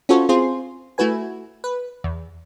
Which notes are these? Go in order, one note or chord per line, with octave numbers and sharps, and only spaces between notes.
C#4 F4 F#4 A4 C5 C#5
C4 F4 G#4 C5 C6
A3 E4 F#4 B4 G#5
B4
E2